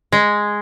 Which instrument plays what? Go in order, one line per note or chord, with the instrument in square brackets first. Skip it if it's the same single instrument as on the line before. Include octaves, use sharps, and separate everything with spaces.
[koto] G#3